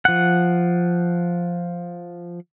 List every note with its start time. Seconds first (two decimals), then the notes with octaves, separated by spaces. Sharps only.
0.05 F3 F#5